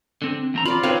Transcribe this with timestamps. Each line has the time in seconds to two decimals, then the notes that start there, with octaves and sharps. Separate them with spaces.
0.22 D3 C4
0.54 E2 C4 A#5
0.65 F4 D5 B5
0.83 C4 D#4 B4 C#5 F5